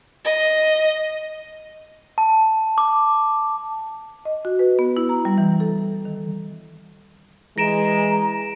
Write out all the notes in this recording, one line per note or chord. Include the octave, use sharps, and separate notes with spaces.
D#5
A5
D6
D#5
F#4
B4
B3
E4
A#5
G3
E3
A4
D#3
E3 G#3 A#5 A#6 D7 E7